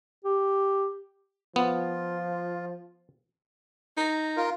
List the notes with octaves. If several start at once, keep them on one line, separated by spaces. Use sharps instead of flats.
G4
F3 B3 F4
D#4 A#5
F4 A#4